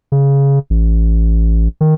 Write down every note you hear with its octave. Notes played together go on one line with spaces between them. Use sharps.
C#3
A1
D#3